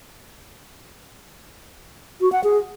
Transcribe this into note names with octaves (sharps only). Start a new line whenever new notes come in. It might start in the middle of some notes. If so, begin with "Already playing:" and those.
F#4
F#5
G#4